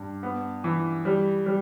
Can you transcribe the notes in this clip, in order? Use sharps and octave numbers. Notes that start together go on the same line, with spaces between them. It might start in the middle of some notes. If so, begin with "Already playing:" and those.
Already playing: G2
B3
E3
G3
G3